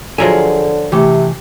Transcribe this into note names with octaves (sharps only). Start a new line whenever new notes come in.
D3 F3 F#3 G#4 A#4 E5 G#5
C3 E3 A3 G4